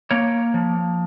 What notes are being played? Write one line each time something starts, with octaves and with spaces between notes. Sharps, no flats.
A#3 C#5
F3